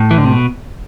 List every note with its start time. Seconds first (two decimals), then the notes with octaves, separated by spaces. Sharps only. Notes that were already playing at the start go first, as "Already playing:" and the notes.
Already playing: A2
0.11 E3
0.18 D3
0.25 C3
0.32 B2